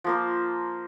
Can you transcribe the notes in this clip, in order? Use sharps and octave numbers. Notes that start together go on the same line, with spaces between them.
F3 A#3 C5